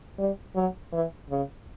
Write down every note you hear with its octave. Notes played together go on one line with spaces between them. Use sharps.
G3
F#3
E3
C#3